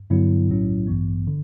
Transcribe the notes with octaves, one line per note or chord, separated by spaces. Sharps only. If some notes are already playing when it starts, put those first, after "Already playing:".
G2 D3 F#3 B3 E4
B1 A2 F#3 C#4 E4
A1 G2 E3 B3
D3